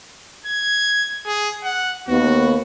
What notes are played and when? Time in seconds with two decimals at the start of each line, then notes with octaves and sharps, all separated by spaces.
0.46 G#6
1.26 G#4
1.64 F#5
2.08 D#2 B3 F#4